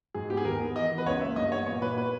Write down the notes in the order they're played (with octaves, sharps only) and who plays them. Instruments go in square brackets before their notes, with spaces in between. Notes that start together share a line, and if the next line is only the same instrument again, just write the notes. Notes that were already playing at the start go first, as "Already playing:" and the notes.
[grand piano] G#2 G#4
B3 G4
G#4
D#2 A#4
B3
E2 D#5
B3
B4
C#2 C#5
A#3 E5
G2 D#5
B3 C#5
A#2 C#5
A#2 B4
B4